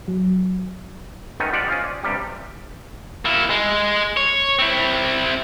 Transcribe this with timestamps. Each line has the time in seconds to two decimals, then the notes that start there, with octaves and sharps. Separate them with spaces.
0.08 F#3
1.40 D#3 A3 B3 C#4 D#4
1.53 F4 G4 C5 D5 F5 F#5
1.67 C#4 F4 C5 D#5
1.84 D5
2.03 G2 C3 G3 G4
3.25 A#3 E4
3.50 G#3
4.17 C#5
4.59 C4 E4